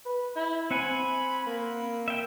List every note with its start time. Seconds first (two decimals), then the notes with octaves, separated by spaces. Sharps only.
0.06 B4
0.36 E4
0.71 C4 F#5 G#5 B5
1.47 A#3
2.08 E5 G5